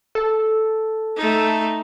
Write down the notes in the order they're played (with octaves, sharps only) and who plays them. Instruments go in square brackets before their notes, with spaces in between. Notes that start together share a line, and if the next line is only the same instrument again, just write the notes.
[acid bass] A4
[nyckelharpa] A3 D#4